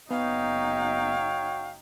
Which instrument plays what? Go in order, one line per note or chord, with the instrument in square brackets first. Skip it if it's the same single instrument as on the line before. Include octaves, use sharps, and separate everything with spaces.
[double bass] F#1 D#4 [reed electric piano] B3 [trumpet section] F#4 C#5 G5 [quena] F5